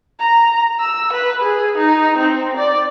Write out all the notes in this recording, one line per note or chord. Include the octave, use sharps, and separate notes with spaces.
A#5
E6
B4
G#4
D#4
C4
D5